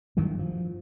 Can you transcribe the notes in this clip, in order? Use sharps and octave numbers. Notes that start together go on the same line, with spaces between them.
G2 D#3 E3 F#3
F3